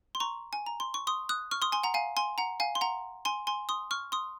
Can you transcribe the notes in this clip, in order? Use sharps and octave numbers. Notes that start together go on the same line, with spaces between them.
C6
A#5 C#6
G#5
A#5
C6
C#6
C6 D#6
D#6 F#6
C#6 F6
C6 D#6
G#5 C6
F#5 A#5
F5 G#5
G#5 C6
F#5 A#5
F5 G#5
C6
F#5 A#5
G#5 C6
G#5 C6
C6 D#6
C#6 F6
C6 D#6